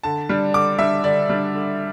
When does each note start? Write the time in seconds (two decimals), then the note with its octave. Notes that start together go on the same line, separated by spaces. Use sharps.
0.03 D3 A5
0.29 G3 D4
0.54 D3 D6
0.79 G3 D4 E5
1.04 D3 D5
1.29 G3 D4
1.54 D3